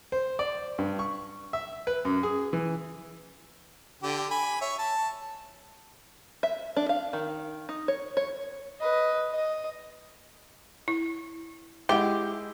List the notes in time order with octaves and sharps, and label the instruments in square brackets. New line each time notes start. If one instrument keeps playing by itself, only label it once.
[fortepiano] C5
D5
G2
C#6
E5
B4
F#2
G#4
E3
[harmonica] D3 G4
G#5 B5
C#5 E5
A5
[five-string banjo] E5
D4
F5
D#3
D#4
C#5
C#5
[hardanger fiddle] B4 D#5
D#5
[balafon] E4
[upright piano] G#3 E4 [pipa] G4 [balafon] E5 F#5